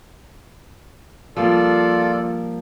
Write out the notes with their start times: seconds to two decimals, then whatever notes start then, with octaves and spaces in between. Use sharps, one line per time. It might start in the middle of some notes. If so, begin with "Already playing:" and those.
1.36 F3 G3 A#3 F4 A4 D5